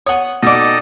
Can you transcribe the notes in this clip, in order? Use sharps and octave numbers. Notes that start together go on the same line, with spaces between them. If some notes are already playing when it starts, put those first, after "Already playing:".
B3 C#5 F#5 D#6
B2 D#4 G4 A4 D5 D#5 D6